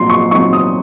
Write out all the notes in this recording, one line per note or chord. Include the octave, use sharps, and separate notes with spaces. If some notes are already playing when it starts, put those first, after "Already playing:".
Already playing: A#1 G#2 F#3 C4 C6
C#6
G#2 F#3 C4 C#6
D#6